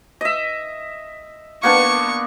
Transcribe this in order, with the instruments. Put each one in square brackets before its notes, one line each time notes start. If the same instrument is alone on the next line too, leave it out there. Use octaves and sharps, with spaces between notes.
[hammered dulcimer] D#5 E5
[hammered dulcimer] A#3 B3 D4 [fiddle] C#6